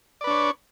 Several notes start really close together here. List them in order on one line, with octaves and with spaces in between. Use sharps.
D5 B4 D4 C#5